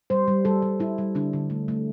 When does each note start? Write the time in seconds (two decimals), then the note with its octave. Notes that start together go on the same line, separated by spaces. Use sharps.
0.10 G3 C5
0.28 G3
0.45 G3 A4
0.62 G3
0.80 G3 E4
0.98 G3
1.15 D3 D4
1.33 D3
1.50 A3
1.68 A3